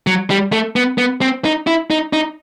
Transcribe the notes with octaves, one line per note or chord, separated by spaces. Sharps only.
F#3
G3
A3
B3
B3
C4
D#4
E4
D#4
D#4